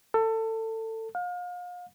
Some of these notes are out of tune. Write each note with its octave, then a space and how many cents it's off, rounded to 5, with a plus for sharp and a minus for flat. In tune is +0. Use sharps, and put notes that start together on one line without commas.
A4 +25
F5 +35